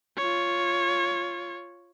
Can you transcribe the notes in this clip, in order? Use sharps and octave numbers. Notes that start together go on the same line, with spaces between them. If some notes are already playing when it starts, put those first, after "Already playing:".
F4 C#5